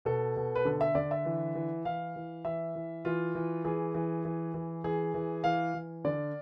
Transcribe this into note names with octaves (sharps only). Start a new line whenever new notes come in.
B2 A4
B2
B4
D3 A4
E5
D3 D5
E5
E3
E3
E3 F5
E3
E3 E5
E3
E3 F4
E3
E3 G#4
E3
E3
E3
E3 G#4
E3
E3 F5
E3
D3 D5